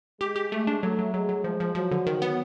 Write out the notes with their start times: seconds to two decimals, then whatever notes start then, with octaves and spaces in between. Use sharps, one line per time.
0.21 G#3 G4
0.36 G4
0.52 G#3 A3
0.67 D4
0.83 F#3 A3
0.99 F#3
1.14 F#3 G#3
1.29 F#3
1.44 F3 G#3
1.60 F3
1.75 F3 F#3
1.91 D3
2.07 D#3
2.22 B3